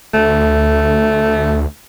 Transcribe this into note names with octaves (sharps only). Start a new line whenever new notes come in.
D2 A3